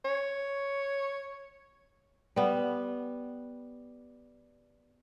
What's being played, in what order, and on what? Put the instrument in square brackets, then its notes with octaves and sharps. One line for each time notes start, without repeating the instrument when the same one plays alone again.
[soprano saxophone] C#5
[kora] G3 B3